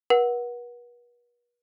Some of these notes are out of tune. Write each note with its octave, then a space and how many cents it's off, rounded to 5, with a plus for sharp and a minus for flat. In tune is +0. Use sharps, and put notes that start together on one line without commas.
B4 -40 F#5 +0